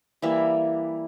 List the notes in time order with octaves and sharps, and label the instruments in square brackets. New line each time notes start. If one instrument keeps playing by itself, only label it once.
[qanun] E3 G3 A#3 E5